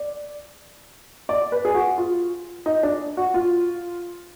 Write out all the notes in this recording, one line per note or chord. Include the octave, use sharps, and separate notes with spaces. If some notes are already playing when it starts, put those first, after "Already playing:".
Already playing: D5
D5
B4
G#4
F#4
F4
D#4
D4
F#4
F4